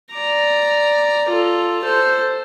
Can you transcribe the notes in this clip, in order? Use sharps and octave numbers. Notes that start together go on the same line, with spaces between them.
D5 A#5
F4 A4
A4 C5